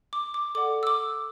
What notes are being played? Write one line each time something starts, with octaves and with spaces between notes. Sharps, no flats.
D6
D6
A4 D5 F#5 D6
E6
D6